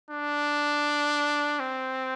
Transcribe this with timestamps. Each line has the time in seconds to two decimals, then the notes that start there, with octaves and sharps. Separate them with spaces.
0.10 D4
1.60 C4